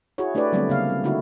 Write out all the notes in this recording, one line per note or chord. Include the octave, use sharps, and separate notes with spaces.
E4 F#4 G#4 C#5
A3 D4 E4 G4 B4 D5
D3 F#3 G3 A3 B3 C4
C#3 A#3 F5
C4
D3 A3 D#4 E4 F#4